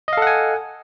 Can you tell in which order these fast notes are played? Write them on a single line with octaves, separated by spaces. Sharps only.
D#5 F5 A4 F#5 G#5